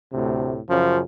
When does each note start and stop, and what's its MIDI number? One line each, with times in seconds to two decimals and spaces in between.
0.13 0.59 38
0.13 0.59 45
0.13 0.59 48
0.70 1.00 42
0.70 1.00 49
0.70 1.00 53